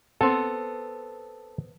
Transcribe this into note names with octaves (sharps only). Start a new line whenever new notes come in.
B3 C4 A4